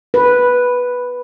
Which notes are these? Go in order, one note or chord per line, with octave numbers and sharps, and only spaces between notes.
B4